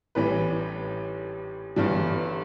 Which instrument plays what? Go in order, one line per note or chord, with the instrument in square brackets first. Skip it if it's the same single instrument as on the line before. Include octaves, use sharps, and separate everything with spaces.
[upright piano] A1 A2 E3 G3 B4
G1 G2 E3 G3